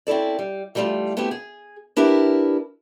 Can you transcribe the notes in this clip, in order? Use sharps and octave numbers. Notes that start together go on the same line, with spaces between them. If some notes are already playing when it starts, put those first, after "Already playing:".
C4 C#4 E4 A4 D5
G3
E3 G3 A3 D4 F4
A3 B3 C4 E4 G4
G#4
D4 E4 G4 A#4 B4